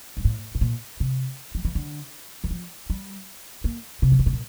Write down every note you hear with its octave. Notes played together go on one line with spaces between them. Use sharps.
G2
A2
A2
A#2
C3
F3
E3
D3
E3
F3
G3
A#3
C3
E3
D3
C3
A#2